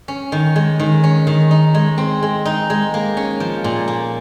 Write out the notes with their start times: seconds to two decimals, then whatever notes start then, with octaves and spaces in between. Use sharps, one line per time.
0.08 C#4
0.32 D#3
0.56 G#3
0.79 D#3
1.04 C#4
1.27 D#3
1.51 D#4
1.74 G#3
1.98 C4
2.23 G#3
2.45 D#4
2.70 G#3
2.94 A#3
3.17 C#4
3.40 F3
3.64 A#2
3.88 A#3